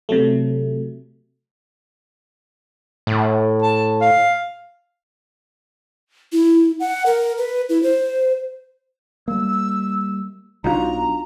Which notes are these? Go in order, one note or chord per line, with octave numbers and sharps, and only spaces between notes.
C3 F#3 A3
A2
A5
F5
E4
F#5
A#4
B4
E4
C5
G3 A#3 E6
B1 G3 D4 D#4 F4 F#4 A#5